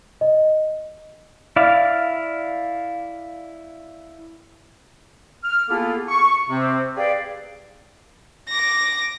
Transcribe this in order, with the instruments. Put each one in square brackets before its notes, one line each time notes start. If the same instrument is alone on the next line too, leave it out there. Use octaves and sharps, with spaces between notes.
[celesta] D#5
[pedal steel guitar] E4 D5 F5
[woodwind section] F6
A#3 B3 E4 F4 G#4 A4
C#6
C3 C4
G4 G#4 B4 D5 F5 G5
[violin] D6 A#6